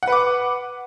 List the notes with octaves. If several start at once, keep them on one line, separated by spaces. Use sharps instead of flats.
B4 F#5 D6